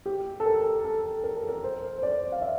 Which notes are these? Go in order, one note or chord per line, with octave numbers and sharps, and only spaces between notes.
G4
A4
A#4
A4
A#4
A4
A#4
C5
C5
D5
F5
E5